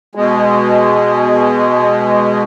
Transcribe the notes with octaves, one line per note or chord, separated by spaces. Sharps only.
B2 G#3